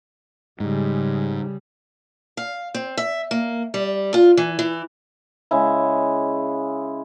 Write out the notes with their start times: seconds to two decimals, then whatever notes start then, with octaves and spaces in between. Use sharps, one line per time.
0.60 G#2 C#3 G3
2.37 F5
2.74 C4
2.97 E5
3.31 A#3
3.74 G3
4.14 F4
4.37 E3
4.59 E3
5.51 C#3 G#3 E4